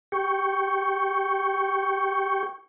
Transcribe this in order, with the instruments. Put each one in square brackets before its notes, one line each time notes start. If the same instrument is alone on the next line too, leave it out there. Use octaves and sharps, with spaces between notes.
[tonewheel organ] G4 G5 C#6